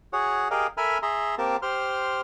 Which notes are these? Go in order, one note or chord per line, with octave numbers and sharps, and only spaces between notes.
F#4 G#4 C#5 F#5
G4 G#4 A#4 D#5 F5
A4 A#4 E5 G#5 B5 F6
G#4 E5 A#5 C6
A#3 C4 G4 A#4 A5
G4 C5 C6 F6